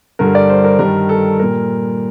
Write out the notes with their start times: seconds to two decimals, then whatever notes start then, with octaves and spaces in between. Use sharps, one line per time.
0.19 G2 D3 G3 A#4
0.35 D5
0.49 C5
0.64 A#4
0.79 G2 D#3 G3 A#4
1.09 A4
1.39 A#2 G3 A#4